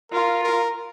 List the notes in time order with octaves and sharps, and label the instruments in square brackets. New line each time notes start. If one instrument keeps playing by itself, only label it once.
[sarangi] F4 [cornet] A#4
[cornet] A#4